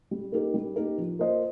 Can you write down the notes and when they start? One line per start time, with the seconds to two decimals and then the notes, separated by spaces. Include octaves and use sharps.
0.11 G3
0.32 A#3 D#4 G4 A#4
0.54 G3
0.76 A#3 D#4 G4 A#4
0.98 F3
1.19 A#3 F4 C5 D#5